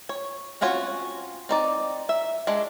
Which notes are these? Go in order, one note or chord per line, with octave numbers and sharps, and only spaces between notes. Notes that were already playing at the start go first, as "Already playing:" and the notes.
C#5
C4 C#4 F4 F#4 C#5
C4 D#4 D5
E5
G#3 D4